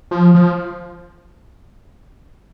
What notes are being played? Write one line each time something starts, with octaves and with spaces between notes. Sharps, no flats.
F3
F3